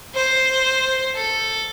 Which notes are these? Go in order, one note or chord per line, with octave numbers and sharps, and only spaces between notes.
C5
A4